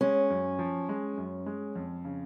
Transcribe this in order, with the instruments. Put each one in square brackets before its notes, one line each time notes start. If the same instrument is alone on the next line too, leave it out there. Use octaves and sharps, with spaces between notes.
[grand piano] G#3 [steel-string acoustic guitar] C#4
[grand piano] F#2
F3
G#3
F#2
G#3
F2
C#3